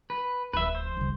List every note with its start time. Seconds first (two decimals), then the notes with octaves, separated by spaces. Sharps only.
0.10 B4
0.53 D1 F3 B4 E5
0.75 C5
0.97 C2 C#3